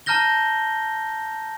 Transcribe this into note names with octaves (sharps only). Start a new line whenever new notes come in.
A5 A#5 F6 G6 A#6 G7